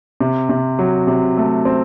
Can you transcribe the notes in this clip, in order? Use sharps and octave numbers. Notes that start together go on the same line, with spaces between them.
C3
C3
F#3
C3
A3
C4